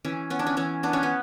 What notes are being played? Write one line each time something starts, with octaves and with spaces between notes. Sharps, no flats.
E3 C#4
B3 C#4
D4
C#4
E3 C#4
B3 D4
C#4
B3